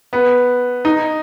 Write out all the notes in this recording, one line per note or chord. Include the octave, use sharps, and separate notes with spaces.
B3
D#4